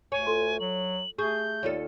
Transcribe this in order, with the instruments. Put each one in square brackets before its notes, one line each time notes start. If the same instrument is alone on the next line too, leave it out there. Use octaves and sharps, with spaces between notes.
[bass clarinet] D2 [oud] C#5 [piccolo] G#5
[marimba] F4 A4 C6
[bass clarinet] F#3 [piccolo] F#7
[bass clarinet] A3 [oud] G#4 [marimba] C#6 [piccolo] G6
[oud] D#2 F4 A4 [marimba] C#5 D5